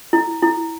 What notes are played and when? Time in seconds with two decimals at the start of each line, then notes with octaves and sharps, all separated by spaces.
0.13 E4
0.43 E4